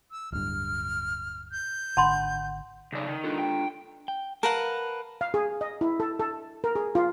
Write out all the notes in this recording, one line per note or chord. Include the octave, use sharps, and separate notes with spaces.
E6
D1 G2 F6
G6
G#1 D3 F#5 A5 B5 C6
B1 C#3 D5
D#3
D4 F4 A4
G5
G5
A#4 B4 F5 F#5 A5
F5
G#4
D#5
E4
A4
A4
A#4
G#4
F4